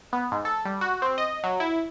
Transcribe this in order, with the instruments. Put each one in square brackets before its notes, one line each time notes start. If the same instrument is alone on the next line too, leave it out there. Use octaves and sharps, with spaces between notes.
[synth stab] B3
G#2
A4
G3
F#4
C4
D#5
F#3
E4